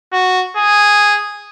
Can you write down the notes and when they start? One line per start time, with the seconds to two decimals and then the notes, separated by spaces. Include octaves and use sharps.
0.13 F#4
0.57 G#4